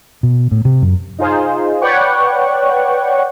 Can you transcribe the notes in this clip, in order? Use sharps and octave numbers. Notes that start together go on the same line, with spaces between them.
B2
A2
C3
F#2
D#4 F4 G#4 C5
B4 C#5 D5 F#5 G5 C#6